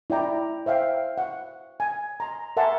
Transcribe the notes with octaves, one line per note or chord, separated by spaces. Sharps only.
E4 D5 G5 A#5
C5 E5 F5 G5
F#5
G#5
A#5 C6
A#4 E5 F#5 G#5 A5 C6